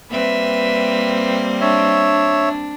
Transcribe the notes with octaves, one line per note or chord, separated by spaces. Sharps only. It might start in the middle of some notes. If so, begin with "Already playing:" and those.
G3 A#3 C4 B4 E5
D4 C#5 E5